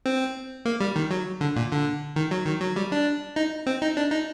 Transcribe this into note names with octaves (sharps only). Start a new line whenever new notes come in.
C4
A#3
G3
D#3
F#3
D3
A#2
D3
D#3
F#3
D#3
F#3
G3
D4
D#4
C4
D#4
D4
D#4